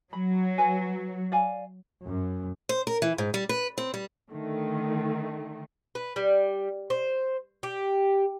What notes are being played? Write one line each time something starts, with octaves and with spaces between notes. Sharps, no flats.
F#3 B5
B4 G#5
D5 F5 G#5
F#2
C5
A#4
E3
G#2
G3
B4
C4
G3
D3 D#3 A3
B4
G3
C5
G4